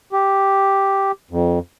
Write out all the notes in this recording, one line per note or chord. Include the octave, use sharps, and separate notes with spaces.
G4
F2